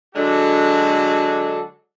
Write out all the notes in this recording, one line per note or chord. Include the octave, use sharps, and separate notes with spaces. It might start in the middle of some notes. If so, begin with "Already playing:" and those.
D3 F#3 G#3 D4 F#4 A4